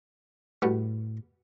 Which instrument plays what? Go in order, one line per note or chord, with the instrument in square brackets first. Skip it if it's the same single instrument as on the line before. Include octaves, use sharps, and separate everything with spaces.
[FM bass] A2 [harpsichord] G3 F#4 B4